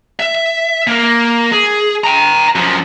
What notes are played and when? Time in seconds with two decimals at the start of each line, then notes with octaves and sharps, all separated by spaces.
0.20 E5
0.87 A#3 A#4
1.52 G#4
2.04 G5 A#5
2.55 F#2 F3